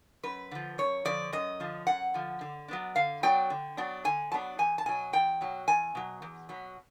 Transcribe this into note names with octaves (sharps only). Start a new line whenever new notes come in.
F#2 B4
D3 F3
F#2 C#5
D3 F3 D5
F#2 D#5
D3 F3
F#2 F#5
D3 F3
D3
F#3 B3 D4
D3 F5
F#3 B3 D4 G5
D3
F#3 B3 D4
D3 G#5
F#3 B3 D4 A5
E2 G#5
A5
B2 F#3 G#5
E2 G5
B2 F#3
E2 G#5
B2 F#3
E2
B2 F#3